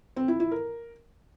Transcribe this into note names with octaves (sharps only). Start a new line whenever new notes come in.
C4
E4
E4
A#4